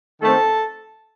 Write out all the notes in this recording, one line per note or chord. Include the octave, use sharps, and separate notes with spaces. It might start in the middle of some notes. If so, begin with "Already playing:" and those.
D#3 A3 C4 A4 A5